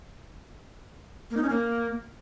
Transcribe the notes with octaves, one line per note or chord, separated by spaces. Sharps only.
A#3
D#4
C#4
A#3